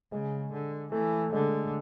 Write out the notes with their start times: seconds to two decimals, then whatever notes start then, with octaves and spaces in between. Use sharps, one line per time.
0.11 C#3 G#3
0.52 D3
0.92 E3 A3
1.33 D3 G#3